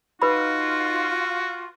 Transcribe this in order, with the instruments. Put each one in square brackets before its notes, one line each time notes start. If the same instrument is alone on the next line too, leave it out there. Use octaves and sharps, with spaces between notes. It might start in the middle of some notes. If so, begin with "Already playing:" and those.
[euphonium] D#4 [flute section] F4 [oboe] F#4 [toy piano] B4 B5